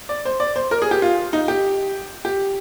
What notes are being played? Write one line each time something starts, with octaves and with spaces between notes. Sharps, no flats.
D5
C5
D5
C5
A#4
G#4
G4
F4
D#4
G4
G4